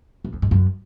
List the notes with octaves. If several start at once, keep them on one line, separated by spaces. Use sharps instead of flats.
F#2
F2
G#2
F#2